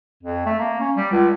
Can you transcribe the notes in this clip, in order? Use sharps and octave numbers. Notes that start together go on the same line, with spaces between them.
F2
A3
A#3
C#4
G3
C#2